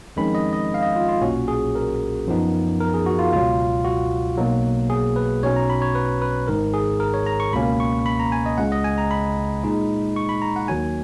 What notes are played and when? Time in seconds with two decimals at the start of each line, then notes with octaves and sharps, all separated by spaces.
0.16 F2 D#3 G#3 C#4 B5
0.35 D#5
0.53 D#5
0.74 F5
0.82 D#5
0.96 F4
1.08 F4
1.22 B1 A#2 F#3 C#4 F#4
1.48 G#4
1.75 A#4
2.27 F#2 F3 B3 D#4
2.80 A#4
2.94 G#4
3.06 F#4
3.19 F4
3.33 C#2 B2 F#3 F4
3.84 F#4
4.38 B1 B2 F#3 A#3
4.90 G#4
5.16 B4
5.43 B1 B2 F#3 C#4 C#5
5.56 A#5
5.70 B5
5.82 C#5
5.95 B4
6.22 B4
6.47 G#1 G#2 D#3 A#4
6.74 G#4
7.00 A#4
7.14 C#5
7.26 A#5
7.40 C#6
7.53 C#2 B2 A#3 C#4 B5
7.80 C#6
8.06 B5
8.19 A#5
8.32 G#5
8.46 D#5
8.58 C#2 C#3 G#3 F#5
8.72 D#5
8.84 G#5
8.98 A#5
9.11 B5
9.63 A#2 G#3 D#4
10.16 C#6
10.29 B5
10.42 A#5
10.56 F#5
10.68 D#2 D#3 F#3 G#5